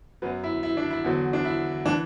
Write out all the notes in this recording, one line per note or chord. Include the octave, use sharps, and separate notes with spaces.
F#2 F#3 B3
E4
E4
D4
E4
E2 D3 F#3
D4
E4
E3 D4